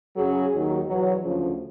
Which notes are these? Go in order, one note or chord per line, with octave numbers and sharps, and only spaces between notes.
F#2 C#3 F#3 G#4
D#2 D#3 F#3
E2 B2 F#3
D2 C#3 F3